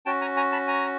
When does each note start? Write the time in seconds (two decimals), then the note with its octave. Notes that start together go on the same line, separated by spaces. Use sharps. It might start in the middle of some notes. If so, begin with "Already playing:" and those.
0.06 C#4 F#4 G5 A5
0.21 G#5 A#5
0.37 G#5 A#5
0.52 A5 B5
0.68 G#5 A#5